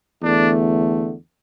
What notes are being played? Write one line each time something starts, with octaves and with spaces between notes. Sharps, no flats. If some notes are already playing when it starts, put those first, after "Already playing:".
E2 D3 A3 D4